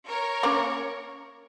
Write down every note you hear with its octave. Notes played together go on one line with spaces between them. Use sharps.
A#4 C#5
A#3 C#4